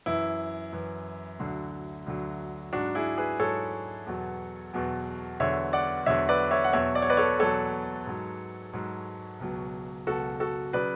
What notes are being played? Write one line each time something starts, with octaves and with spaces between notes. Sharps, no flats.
F#2 E3 E4
F#2 E3
D2 D3 F#3
D2 D3 F#3
G#2 F#3 D4 F#4
E4 G#4
G#4 B4
G#2 F#3 A4 C#5
E2 B2 F#3
E2 B2 F#3
E2 D3 F#3 C#5 E5
D5 F#5
E2 D3 F#3 C#5 E5
B4 D5
C#5 E5
F#5
E2 B2 F#3 C#5 E5
D5
C#5
B4 D5
A4 C#5
E2 B2 F#3 A4 C#5
G#2 F#3
G#2 F#3
C#2 B2 F#3
C#2 B2 F#3 F#4 A4
F#4 A4
C#3 F#3 B4 D5